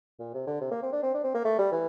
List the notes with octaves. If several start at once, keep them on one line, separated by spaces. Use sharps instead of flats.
A#2
C3
D3
C3
A#3
C4
D4
C4
D4
C4
A#3
A3
G3
E3